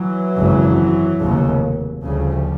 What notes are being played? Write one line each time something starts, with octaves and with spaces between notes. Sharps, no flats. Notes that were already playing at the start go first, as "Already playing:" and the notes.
Already playing: E3 F#3
G#1 F#2 C#3
F1 D#2 C#3
D2 C#3 F3 G3